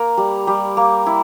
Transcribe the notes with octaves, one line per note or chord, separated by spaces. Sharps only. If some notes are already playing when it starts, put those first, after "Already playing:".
Already playing: A#3 A#4
G3
G3
A#3
E4